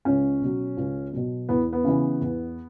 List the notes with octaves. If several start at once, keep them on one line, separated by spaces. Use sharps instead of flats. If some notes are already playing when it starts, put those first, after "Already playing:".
C#2 C#4
B2 F#3
C#2
B2 F#3
E2 B3
B3
C#3 E3
E2